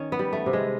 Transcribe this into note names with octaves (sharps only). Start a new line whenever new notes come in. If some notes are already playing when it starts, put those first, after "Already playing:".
Already playing: D#3 C#4
B3
G3
A3
C3
G#3